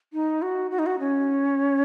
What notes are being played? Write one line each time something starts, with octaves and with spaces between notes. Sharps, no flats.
D#4
F#4
F#4
D#4
F#4
C#4